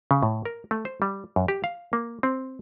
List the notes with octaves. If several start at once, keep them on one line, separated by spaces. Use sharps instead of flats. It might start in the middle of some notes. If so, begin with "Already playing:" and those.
C#3
A2
A#4
A3
C5
G3
F#2
G4
F5
A#3
C4